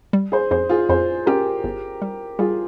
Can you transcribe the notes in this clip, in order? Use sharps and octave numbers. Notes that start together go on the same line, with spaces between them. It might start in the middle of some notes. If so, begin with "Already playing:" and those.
G3
G#4 C5
F2 G#4 C5
F4 G#4
F2 G#4 C5
C#4 G4 A#4
G1
G3
G3 F4 G#4